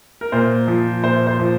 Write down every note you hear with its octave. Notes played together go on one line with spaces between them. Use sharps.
A#4
A#2 C5
F3
A#2 C5
C5
F3